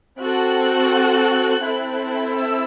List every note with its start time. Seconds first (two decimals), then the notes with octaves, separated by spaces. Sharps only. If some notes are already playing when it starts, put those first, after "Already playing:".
0.20 C4 F#4 A4 F#6
1.63 C4 E4 A4
2.34 E6